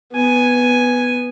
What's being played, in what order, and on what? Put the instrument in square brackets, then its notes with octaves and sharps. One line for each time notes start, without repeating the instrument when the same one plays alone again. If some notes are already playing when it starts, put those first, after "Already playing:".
[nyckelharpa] B3 G#5